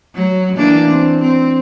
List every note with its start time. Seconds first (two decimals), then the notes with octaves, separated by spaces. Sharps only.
0.15 F#3
0.56 E3 A#3 D4
0.89 C4
1.21 C4